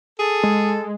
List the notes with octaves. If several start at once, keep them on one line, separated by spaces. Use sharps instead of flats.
G#4 A4
G#3